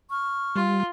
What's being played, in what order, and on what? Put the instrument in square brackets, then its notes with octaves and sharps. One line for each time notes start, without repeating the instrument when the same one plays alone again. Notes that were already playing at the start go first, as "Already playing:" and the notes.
[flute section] C#6 F6
[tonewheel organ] G3 [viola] F4